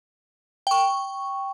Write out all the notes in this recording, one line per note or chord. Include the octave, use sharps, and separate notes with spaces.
G5 C#6